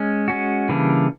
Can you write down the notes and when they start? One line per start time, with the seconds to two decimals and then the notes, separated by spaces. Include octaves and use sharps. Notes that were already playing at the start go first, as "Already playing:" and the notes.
Already playing: G#3 C#4
0.28 G#3 C#4 F#4
0.69 C#3 E3 G3 A#3 D4